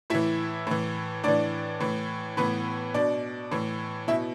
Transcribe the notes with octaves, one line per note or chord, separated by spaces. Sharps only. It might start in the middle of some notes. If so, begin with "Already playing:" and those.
A2 E3 E4 E5
A2 E3
A2 E3 D4 D5
A2 E3
A2 E3 B3 B4
B2 D4 D5
A2 E3
B2 E4 E5